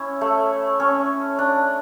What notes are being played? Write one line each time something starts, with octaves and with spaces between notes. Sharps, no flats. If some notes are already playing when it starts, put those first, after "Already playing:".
Already playing: C#4 E4
A3
C#4
D4